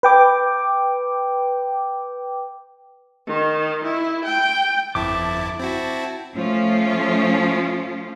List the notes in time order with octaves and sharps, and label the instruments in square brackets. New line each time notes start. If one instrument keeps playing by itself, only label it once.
[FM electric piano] B4 G5 D6
[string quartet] D#3
E4
G5
[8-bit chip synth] G1 F2 E4 [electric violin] A5 [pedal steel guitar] D6
[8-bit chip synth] C4 E4 F#4 [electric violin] A5
[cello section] F3 A3 C#4 F4